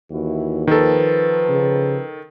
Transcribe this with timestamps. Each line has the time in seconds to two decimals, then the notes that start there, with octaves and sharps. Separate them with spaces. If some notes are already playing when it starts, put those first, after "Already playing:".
0.11 D#2 E3 E4 F#4
0.67 D#3 F3 A4 B4
1.49 C#3